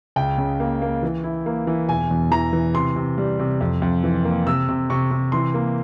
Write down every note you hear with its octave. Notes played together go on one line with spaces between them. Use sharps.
C#2 G5
C#3
A#3
A#3
E3
E4
A#3
E3
E1 G#5
E2
E3 A#5
E3
C3 C6
C3
G3
C3
F2
F2
E3
A#3
C3 E6
C3
C3 C#6
C3
E3 C6
A#3